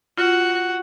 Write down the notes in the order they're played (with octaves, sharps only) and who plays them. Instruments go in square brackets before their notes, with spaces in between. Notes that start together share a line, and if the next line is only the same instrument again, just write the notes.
[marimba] F4 [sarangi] F#4